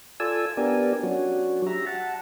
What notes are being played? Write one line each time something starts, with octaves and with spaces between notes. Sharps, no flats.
F4 A4 D5 G#5 E6
B3 D4 G4 A#4 D5 G#5
F#3 C#4 D4 F#4
G4 E5 A#5
F#5 A5